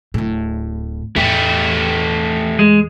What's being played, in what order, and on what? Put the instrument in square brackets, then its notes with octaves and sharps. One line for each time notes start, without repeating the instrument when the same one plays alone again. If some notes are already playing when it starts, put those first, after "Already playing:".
[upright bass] D1 A2
[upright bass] E2 A2 [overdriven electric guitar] A3 G4
[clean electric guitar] G#3